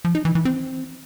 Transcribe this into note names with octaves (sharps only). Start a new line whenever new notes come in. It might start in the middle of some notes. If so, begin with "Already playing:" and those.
F3
D#4
E3
E3
C4